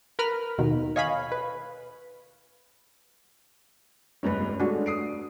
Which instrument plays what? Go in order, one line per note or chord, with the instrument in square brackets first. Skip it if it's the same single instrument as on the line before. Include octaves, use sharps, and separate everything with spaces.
[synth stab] A#4 B4 A#5 B5 F6
D#2 B2 D#3
C#5 D#5 F5 G#5 B5
B4
[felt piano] F1 C#2 G2 [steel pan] C#4 B4
[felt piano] G#3 A3 [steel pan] D4 F#4
[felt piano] D#6 C7 D7